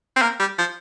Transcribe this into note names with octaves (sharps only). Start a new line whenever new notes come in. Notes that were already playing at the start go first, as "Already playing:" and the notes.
C4
A#3
G3
F3